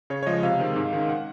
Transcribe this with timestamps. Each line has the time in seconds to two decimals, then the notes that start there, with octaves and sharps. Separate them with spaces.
0.10 C#3 C#5
0.23 C#5
0.26 F3 G#3 D#5
0.43 C3 F5
0.60 D#3 G#3 C4
0.76 G#2
0.93 D#3 G#3 C#4
1.09 F#5